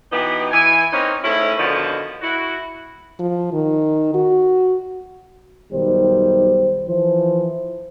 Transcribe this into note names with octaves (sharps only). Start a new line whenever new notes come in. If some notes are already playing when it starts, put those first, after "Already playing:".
B2 E3 B3 D#4 G4
E3 G#5
A#3 C4 C#4 D#4 B4 C#5
G#2 A3 C#4 E4
B2 D3 D#3 F3 A#3 C#4
E4 F#4
F3
D#3
F#4
B1 D#3 G3 C5
E3 F3 C5